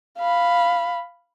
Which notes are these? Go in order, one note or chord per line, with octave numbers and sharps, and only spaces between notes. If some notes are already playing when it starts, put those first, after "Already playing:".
F5 B5